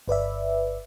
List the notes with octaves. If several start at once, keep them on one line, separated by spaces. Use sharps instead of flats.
G1 B4 D5 E5